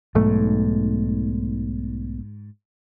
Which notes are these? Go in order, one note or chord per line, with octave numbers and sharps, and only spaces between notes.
B1 G#2 A3